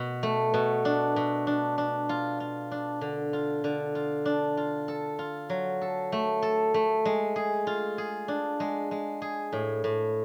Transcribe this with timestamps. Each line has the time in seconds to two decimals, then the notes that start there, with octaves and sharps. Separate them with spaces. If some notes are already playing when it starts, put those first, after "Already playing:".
Already playing: B2
0.23 A3
0.54 B2
0.85 D4
1.16 B2
1.47 D4
1.78 D4
2.09 F4
2.40 F4
2.71 D4
3.01 D3
3.33 F4
3.64 D3
3.95 F4
4.25 D4
4.57 F4
4.88 A4
5.19 F4
5.50 F#3
5.81 A4
6.12 A3
6.42 A4
6.74 A3
7.05 G#3
7.36 G#4
7.67 F4
7.98 G#4
8.28 D4
8.60 G#3
8.91 G#3
9.22 G#4
9.53 A2
9.84 A2